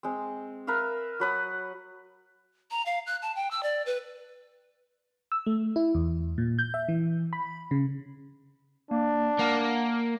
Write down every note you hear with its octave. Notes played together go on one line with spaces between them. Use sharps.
G#3 C4
A#4 B4 E5 F5
F#3 B4 D#6
A#5
F5
F#6
A5
G5
E6
D5
B4
E6
A3
E4
E2
A#2
G6
E5
E3
B5
C#3
A#3 D4
A#3 F#5